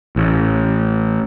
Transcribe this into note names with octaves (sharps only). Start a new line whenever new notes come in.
A1